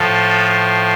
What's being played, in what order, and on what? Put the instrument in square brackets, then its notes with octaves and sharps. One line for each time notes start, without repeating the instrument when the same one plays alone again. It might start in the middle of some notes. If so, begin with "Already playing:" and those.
Already playing: [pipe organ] A2 F3 A4